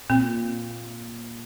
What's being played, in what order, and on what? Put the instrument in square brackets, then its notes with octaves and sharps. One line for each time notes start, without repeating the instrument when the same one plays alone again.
[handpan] A#2 [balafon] C4